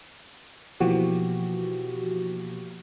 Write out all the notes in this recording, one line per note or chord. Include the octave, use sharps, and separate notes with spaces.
B2 E3 F3 A#3 F#4 G4